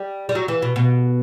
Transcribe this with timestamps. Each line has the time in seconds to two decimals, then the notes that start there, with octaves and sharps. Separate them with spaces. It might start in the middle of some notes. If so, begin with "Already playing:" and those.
Already playing: G3
0.29 G3
0.35 F#3
0.48 E3
0.62 B2
0.76 B2